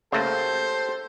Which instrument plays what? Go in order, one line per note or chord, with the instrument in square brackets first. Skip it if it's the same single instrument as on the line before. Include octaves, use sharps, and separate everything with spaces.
[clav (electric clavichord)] C#3 A3 A#3 [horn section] G4 A4 C5